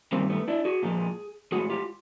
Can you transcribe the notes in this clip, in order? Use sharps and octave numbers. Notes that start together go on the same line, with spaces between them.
G2 D#3 G3 A#3 C4
A3 B3
D4 E4
F#4 G#4
A#2 F3 G#3
A2 F3 G#3 F#4 G#4
F4 G4